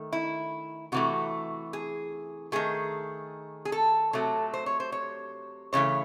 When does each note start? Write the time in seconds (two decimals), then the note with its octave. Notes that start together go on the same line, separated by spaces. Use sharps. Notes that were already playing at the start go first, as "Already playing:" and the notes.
Already playing: D#3 A3
0.12 E4
0.92 C3 E3 A3 F#4
1.73 G#4
2.52 D#3 A3 G#4
3.65 G#4
3.72 A4
4.13 C3 F#3 A3
4.54 C5
4.66 C#5
4.80 C5
4.92 C#5
5.73 C#3 E3 A3 C#5